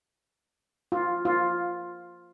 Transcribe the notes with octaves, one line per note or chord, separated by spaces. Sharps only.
F4
F4